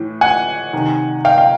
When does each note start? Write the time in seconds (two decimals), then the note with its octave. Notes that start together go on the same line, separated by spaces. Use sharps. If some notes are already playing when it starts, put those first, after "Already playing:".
Already playing: A2 E3
0.21 F#5 G#5
0.73 C3 D#3
1.25 F5 G5
1.38 F5 G5